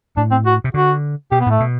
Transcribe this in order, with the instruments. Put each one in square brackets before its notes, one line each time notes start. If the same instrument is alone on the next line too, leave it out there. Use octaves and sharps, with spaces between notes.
[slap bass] A2 [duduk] D4
[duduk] C4
F#4
[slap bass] C3
[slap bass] D3 [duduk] F#4
[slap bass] B2 [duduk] G4
[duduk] B3
[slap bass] A2 [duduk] A3
[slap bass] B2